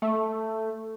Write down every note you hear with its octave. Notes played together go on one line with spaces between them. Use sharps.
A3